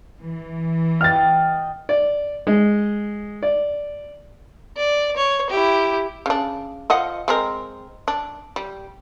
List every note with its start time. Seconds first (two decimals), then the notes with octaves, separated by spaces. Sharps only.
0.19 E3
1.01 D#5 F#5 G5 F6 A6
1.89 D5
2.47 G#3
3.43 D5
4.77 D5
5.16 C#5
5.50 E4 G4
6.26 C#3 D4
6.90 F3 D#5 F#5
7.28 G#3 C4 A#4
8.08 D4
8.56 G3